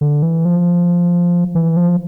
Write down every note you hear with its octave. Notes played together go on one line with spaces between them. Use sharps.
D3
E3
F3
E3
F3